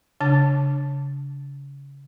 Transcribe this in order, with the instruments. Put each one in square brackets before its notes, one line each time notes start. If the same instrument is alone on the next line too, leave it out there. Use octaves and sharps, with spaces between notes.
[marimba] C#3 D4 A5 A6